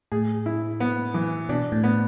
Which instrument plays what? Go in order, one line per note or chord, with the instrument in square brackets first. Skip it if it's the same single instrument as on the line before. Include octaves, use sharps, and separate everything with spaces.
[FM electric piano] A2 [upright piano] G#4
[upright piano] E4
B3
E3
[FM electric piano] B2 [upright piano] D4
[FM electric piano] A2
[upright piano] B3